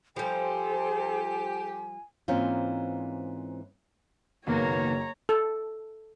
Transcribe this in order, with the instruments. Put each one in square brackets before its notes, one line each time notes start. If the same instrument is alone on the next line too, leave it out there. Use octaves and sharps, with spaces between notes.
[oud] F3 G3 [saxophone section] G4 [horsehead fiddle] A4 C5 [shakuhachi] G#5
[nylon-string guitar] G#2 E3 A#3 C4 C#4 F4
[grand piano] F#1 [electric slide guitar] B2 D#3 B3 [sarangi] A#3 [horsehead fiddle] C#5 A#5
[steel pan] A4